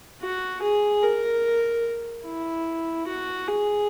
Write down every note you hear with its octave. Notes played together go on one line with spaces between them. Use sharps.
F#4
G#4
A#4
E4
F#4
G#4